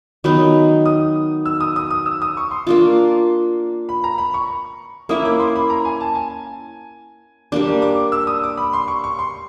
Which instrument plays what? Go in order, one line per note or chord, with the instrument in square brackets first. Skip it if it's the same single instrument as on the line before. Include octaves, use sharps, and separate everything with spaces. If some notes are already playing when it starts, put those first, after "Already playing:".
[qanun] D#3 F#3 B3 D#4 [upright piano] B5
[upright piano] D#6
E6
D#6
D#6
D#6
E6
D#6
C#6
C6
[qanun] A#3 D4 F4
[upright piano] B5
A#5
B5
C#6
[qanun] A#3 C#4 E4 [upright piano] D#6
[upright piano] D6
C6
B5
A#5
G#5
A5
G#5
[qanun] G3 A#3 D4 [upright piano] D6
[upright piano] D6
D6
E6
D#6
D6
B5
C6
C#6
C#6
C6